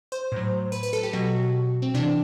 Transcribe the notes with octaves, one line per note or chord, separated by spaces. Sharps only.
C5
A2 F#3
B4
B4
A4
G4
B2 F#3 F#4
C4
C3 E3 D4